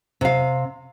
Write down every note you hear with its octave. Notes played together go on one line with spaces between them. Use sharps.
C3 F5